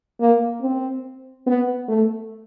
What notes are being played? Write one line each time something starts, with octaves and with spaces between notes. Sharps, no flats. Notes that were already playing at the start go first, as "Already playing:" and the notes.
A#3
C4
B3
A3